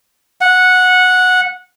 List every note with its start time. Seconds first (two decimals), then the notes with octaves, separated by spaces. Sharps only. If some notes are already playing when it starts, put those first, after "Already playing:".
0.41 F#5